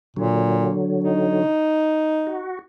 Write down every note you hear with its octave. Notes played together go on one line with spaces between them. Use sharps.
A#2 D3 F#3
D#4
F#4